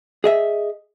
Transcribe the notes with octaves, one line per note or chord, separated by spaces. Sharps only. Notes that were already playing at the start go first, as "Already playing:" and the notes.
G#4 D#5 E5